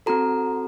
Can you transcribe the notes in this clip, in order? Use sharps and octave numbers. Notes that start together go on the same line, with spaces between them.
C4 F#4 A4 A#5